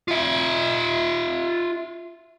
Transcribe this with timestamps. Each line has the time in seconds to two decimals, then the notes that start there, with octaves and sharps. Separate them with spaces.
0.08 F4 E5